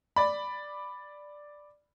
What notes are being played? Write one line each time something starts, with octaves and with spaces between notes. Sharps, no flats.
D5 B5